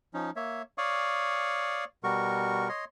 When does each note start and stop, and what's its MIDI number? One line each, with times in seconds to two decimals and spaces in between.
0.14 0.31 53
0.14 0.31 61
0.14 0.31 63
0.36 0.62 58
0.36 0.62 73
0.36 0.62 76
0.78 1.84 73
0.78 1.84 74
0.78 1.84 77
0.78 1.84 85
0.78 1.84 87
2.04 2.68 47
2.04 2.68 55
2.04 2.68 66
2.04 2.68 70
2.04 2.68 85
2.69 2.85 73
2.69 2.85 75
2.69 2.85 84